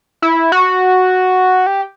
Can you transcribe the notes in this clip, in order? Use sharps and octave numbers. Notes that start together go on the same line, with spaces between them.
E4
F#4
G4